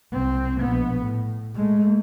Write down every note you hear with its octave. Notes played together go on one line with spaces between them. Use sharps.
C2 C4
A#1 B3
A2
G#3 A3